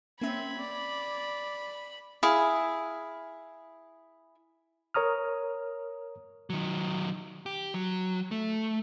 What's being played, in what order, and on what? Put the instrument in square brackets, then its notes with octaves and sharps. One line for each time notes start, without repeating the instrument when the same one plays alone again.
[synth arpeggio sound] A#3 C#4 E5 [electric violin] C4 G#6 [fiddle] B5
[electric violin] D5
[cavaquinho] E4 G#4 F5
[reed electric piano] A#4 C#5 A#5 D#6 F6
[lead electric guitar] D#3 F#3
G4
F#3
A3